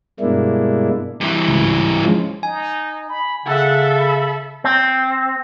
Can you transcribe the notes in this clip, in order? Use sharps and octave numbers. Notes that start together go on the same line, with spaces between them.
G2 B2 G#3 A#3 D4 E4
G2 E3
C#2 G#2
F3 G#3 C#4
D#4 G#5
B5
C#3 A4 E5 F#5
B5
C4